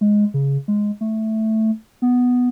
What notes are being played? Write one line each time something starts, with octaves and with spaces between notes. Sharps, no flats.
G#3
C#3
G#3
A3
B3